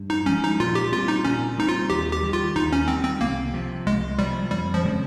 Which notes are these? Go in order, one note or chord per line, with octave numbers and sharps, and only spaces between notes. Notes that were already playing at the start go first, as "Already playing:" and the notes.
Already playing: G2
D#4
F3 G#3 C#4
D#4
A#2 F4
G4
G3 C4 F4
D#4
A#2 C#4
G3 C4 D#4
F4
D#2 G4
G4
D#3 G3
F4
D#2 D#4
C#4
D#3 G3 C4
C4
C2 A#3
C3 F3
C2 G#3
C3 F3 G3
F2 G3
F3
C#3 G#3 C4